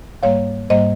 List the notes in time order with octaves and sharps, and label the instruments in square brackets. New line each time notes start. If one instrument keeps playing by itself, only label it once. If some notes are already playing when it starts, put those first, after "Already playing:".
[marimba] G#2 G3 A#3 C#5 F5
G#2 G3 A#3 C5 D#5